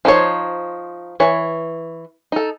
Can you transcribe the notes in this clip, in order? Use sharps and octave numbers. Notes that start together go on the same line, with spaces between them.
F3 D#4 C5 C#5
E3 C#5
D#4 A4